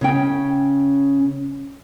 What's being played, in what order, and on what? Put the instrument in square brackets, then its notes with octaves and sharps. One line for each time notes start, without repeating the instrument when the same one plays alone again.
[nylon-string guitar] C#3 C#4 G5